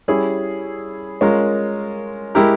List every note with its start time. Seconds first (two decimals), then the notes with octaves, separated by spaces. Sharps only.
0.08 G3 C#4 E4 G#4
1.21 G#3 C#4 F4 A#4
2.35 G#3 E4 G4 A#4